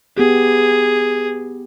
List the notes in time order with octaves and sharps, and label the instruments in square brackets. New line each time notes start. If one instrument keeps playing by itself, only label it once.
[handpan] B3 G4 [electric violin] G#4